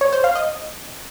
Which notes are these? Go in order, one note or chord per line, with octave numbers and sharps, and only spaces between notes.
C#5
C5
F5
D#5